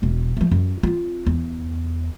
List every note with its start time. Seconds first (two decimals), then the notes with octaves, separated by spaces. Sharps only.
0.02 E1 B2
0.37 F3 A3
0.52 F#2
0.83 C4 F4
1.27 E2